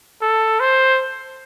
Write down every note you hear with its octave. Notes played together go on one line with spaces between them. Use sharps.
A4
C5